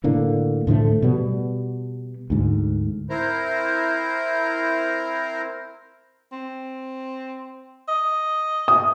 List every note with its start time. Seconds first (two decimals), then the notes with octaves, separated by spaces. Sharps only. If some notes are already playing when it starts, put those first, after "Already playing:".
0.04 A2 D3 A#3
0.67 A2 D3 F3 A3
1.02 B2 G3 B3
2.30 D2 G#2
3.10 C4 E4 A#4 C5 A#5
6.32 C4
7.88 D#5
8.68 D#6